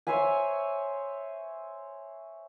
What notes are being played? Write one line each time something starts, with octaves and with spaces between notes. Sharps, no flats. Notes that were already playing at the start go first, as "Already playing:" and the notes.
C5 C#5 E5 G#5